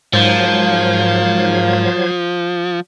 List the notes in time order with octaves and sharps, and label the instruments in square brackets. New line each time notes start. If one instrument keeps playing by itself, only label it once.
[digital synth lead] G#2 [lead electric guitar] F3 [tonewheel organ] F#3 C5 G#6 [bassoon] A#3